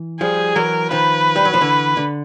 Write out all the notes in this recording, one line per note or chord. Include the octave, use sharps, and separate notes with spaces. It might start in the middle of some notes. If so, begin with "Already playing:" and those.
Already playing: E3
F3 G3 G#4
E3 F#3 A#4
D#3 F3 B4
G3
F#3
F3
D3 E3
D3